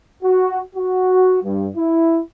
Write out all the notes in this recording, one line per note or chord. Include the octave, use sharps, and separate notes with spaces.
F#4
F#4
G2
E4